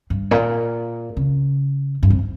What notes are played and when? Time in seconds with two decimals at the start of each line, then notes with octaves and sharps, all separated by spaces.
0.10 G2
0.31 A#2
1.17 C#3
2.03 G2
2.10 F2